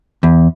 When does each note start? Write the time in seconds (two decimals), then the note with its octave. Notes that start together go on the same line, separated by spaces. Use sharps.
0.23 E2